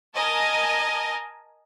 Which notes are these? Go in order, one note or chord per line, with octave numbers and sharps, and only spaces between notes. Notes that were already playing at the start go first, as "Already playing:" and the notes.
A#4 D#5 G#5 A5